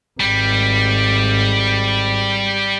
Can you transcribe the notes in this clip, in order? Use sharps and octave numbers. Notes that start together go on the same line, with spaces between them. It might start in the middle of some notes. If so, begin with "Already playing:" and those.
G#1 G3